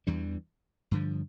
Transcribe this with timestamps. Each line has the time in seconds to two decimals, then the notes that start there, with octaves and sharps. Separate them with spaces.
0.07 E2 E3 G3 D4
0.91 G2 D3 F3